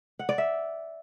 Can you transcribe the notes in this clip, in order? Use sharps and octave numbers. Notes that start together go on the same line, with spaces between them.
F#5
D5
E5